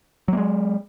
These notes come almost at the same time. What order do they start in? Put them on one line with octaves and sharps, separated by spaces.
F#3 A#3 G#3